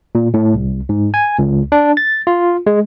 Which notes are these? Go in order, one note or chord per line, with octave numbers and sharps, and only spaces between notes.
A#2
A2
C2
G#2
G#5
C#2
D4
A6
F4
G#3